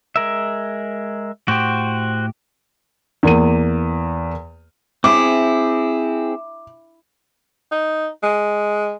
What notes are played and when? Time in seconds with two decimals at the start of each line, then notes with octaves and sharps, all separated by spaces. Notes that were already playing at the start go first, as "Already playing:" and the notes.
0.16 G#3 A#4 E5
1.48 A2 F#4 G4 C5
3.23 E2 A#3 D#7
5.04 C4 E4 G#4 D6
7.72 D#4
8.23 G#3